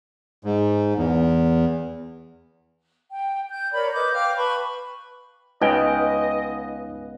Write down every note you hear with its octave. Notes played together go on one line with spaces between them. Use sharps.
G#2
E2
G5
G6
A#4 C#5 D5 B5
B4 D#5 D6 G6
F5 G5 D6 F6
B4 A5 B5 C#6
C#2 B3 D#4 B4 D#5 G5 G#5